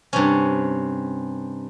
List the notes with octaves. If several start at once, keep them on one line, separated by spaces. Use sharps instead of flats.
G2 C3 C#4